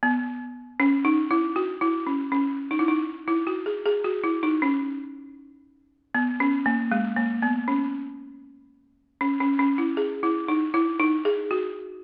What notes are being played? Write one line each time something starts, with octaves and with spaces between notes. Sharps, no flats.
B3
C#4
D#4
E4
F#4
E4
C#4
C#4
D#4
E4
D#4
E4
F#4
G#4
G#4
F#4
E4
D#4
C#4
B3
C#4
A#3
G#3
A#3
B3
C#4
C#4
C#4
C#4
E4
G#4
E4
D#4
E4
D#4
G#4
F#4